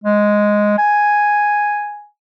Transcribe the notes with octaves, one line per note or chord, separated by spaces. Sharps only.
G#3
G#5